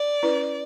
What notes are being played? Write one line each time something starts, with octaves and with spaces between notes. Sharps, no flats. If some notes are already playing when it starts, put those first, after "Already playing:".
Already playing: D5
C#4 E4 B4